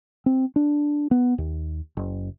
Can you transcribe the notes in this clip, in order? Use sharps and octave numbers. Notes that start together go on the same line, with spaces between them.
C4
D4
B3
D#2
F#1